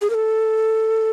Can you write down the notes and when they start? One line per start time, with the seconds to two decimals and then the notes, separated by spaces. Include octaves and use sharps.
0.02 G#4
0.10 A#4
0.14 A4